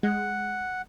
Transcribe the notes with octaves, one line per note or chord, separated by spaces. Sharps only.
G#3 F#5